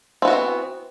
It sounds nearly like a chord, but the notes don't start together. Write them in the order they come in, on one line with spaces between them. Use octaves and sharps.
C4 B3 F#4 F3 E3